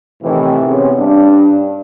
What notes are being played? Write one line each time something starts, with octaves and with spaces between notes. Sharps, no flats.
A2 C3 D#3 E3
C3 B3 C#4 G#4
G2 D4